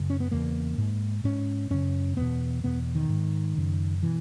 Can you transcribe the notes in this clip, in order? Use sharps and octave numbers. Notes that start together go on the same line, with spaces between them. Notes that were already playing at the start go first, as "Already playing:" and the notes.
Already playing: F#2 C#3
C#4
B3
E2 C#3 A#3
G#2
G#2 C#4
F#2 C#3 C#4
E2 B2 B3
E2 B2 B3
D#3
G#2
F#2 C#3
B2 E3